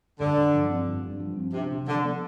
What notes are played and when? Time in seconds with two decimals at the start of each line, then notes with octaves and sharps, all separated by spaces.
0.20 G2 D3
0.37 G2
0.54 F3
0.70 C4
0.87 G2
1.03 G2
1.20 F3
1.37 C4
1.53 C3 D4
1.71 C3
1.87 D3 F3
2.04 B3